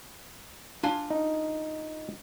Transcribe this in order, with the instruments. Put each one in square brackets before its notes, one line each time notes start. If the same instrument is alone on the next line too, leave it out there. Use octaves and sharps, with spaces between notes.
[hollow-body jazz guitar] D4 F4 G#5
[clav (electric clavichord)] D#4